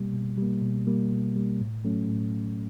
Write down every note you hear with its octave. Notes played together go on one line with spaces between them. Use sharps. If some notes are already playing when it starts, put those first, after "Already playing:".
Already playing: B2 G3 A#3
B2
G3 A#3
B2
G3 A#3
B2
G3 A#3
A2
F#3 A3 C#4
A2